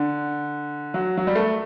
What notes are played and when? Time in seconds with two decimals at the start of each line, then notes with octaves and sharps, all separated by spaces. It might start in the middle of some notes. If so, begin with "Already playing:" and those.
Already playing: D3
0.94 F#3
1.17 F#3
1.27 G3
1.35 A3